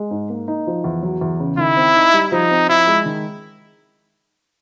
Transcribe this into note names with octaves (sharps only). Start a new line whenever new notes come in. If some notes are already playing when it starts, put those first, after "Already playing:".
Already playing: G#3
G#2
A#3
D#4
F3
E2
F#3
E2
C#3
D#3 E4
C4
D#4
G3
F3 D#4
C4
F3 E4
G#3
D#3